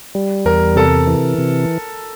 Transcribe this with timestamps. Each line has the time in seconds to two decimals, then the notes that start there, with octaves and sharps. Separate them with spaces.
0.15 G3
0.45 E2 A#4
0.76 C3 A4
1.07 E3
1.38 C3